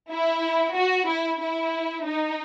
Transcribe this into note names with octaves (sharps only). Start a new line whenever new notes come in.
E4
F#4
E4
E4
D#4